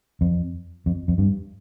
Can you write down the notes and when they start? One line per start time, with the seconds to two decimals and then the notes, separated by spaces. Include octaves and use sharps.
0.21 F2
0.86 F2
1.08 F2
1.18 G2